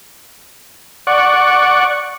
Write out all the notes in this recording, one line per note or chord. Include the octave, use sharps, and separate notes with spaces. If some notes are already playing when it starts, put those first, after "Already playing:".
D5 F#5 C#6